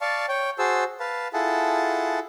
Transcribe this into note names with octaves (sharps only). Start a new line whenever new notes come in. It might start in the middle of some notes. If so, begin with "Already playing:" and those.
D5 F5 A5 C#6
C#5 G5
F#4 G#4 C5 A5 E6
B4 F5 A5
E4 F4 G#4 A4 F#5 A5